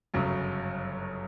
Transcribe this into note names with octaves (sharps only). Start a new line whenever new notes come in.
G1 F#2 C#3 F#3